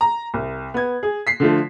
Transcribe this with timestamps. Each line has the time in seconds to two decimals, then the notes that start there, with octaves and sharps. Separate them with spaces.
0.01 A#5
0.34 C2
0.74 B3 G#6
1.03 G#4
1.27 B6 C7
1.40 D3 F3 A3